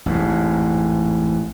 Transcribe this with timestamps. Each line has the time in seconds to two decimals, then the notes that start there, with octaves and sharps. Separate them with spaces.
0.06 A1 F2 G#2